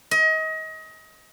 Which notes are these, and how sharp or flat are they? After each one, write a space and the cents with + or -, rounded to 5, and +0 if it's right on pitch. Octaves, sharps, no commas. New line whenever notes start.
D#5 +30